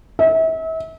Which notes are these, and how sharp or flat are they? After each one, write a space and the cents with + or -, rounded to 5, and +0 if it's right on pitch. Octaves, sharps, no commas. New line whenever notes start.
E5 -35